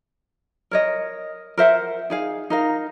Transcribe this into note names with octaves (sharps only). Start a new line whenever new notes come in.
A#4 C#5 D#5
A#4 C5 E5 F#5
D#4 G#4 F5
D#4 A#4 F5